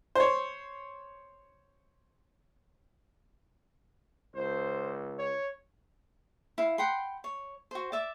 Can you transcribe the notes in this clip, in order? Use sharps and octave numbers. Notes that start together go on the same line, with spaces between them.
C5 C#5
C#2 C5
C#5
E4 F5
F#5 G5 B5 C6
C#5
F#4 C5
D5 E5 D6